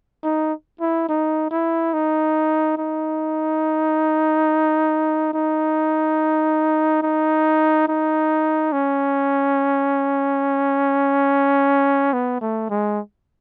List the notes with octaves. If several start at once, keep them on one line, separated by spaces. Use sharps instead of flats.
D#4
E4
D#4
E4
D#4
D#4
D#4
D#4
D#4
C#4
B3
A3
G#3